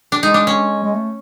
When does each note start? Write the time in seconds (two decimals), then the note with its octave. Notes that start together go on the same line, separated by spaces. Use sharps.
0.12 D4
0.23 G#3 D#4
0.34 D4
0.47 C#4
0.84 G#3
0.94 A3